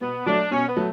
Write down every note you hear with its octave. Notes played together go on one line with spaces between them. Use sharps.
B2 B3
F#3 A3 D4
B2 C#4
B3
F#3 A3